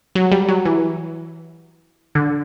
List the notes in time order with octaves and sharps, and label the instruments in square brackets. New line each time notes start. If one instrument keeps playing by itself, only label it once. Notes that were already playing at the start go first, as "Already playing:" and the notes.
[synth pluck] F#3
G3
F#3
E3
D3